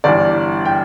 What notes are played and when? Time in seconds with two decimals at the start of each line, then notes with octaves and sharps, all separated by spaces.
0.04 G1 G2 E3 D5
0.65 G5